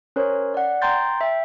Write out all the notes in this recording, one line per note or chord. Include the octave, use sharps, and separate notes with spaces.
C#4 A#4 C5 C#5
D5 F#5
G5 A#5 C6 G6 A6
E5 G5